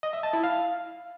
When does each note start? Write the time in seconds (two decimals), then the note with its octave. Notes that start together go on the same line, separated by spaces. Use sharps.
0.03 D#5
0.13 E5
0.23 A5
0.33 E4
0.44 F5